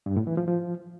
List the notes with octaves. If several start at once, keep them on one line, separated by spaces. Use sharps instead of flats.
G2
A2
E3
F3
F3